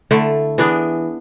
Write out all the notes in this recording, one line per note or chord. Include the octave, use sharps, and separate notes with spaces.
D3 A3 E4
E3 B3 D4 G#4